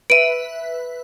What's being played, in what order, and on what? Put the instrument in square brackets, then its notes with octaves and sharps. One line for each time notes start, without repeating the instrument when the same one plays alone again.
[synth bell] B4 E5 [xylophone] D7 D#7